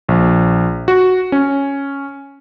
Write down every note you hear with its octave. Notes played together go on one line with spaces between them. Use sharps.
A#1
F#4
C#4